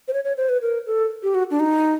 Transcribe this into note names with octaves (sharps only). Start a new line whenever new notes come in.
C5
C#5
C#5
C5
B4
A#4
A4
G4
F#4
D4
D#4